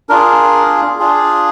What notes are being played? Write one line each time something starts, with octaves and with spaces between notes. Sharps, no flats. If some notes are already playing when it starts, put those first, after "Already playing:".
D4 F4 G#4 A#4
D4 F4 G#4